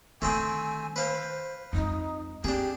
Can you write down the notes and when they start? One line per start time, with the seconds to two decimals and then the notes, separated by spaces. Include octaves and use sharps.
0.22 D3 D#3 A3 C4 G5 G#5
0.96 B4 C5 F5
1.73 F2 G#3 D#4
2.44 C4 D4 G4 G#4